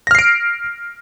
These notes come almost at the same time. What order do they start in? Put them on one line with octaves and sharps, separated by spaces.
A#6 F6 C7 D7